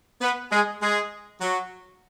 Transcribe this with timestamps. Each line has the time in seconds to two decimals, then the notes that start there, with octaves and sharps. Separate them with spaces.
0.21 B3 B4
0.51 G#3 G#4
0.81 G#3 G#4
1.41 F#3 F#4